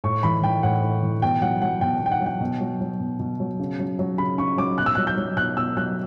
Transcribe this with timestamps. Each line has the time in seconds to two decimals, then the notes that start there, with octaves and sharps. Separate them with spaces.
0.04 A2 C#6
0.23 E3 B5
0.43 E3 G5
0.63 A2 F#5
0.83 A2
1.03 E3
1.22 B2 G5
1.42 F#3 F#5
1.62 F#3 F#5
1.81 B2 G5
2.01 B2
2.06 G5
2.11 F#5
2.21 F#3
2.26 G5
2.41 B2
2.61 F#3
2.81 F#3
3.00 B2
3.20 B2
3.40 F#3
3.60 C#3
3.79 F#3
3.99 F#3
4.18 C#3 B5
4.38 C#3 C#6
4.57 F#3 D6
4.78 B2 F#6
4.86 E6
4.95 F#3 F#6
5.07 G6
5.17 F#3
5.37 B2 F#6
5.57 B2 E6
5.77 F#3 F#6